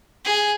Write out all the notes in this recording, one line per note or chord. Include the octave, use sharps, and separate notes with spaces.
G#4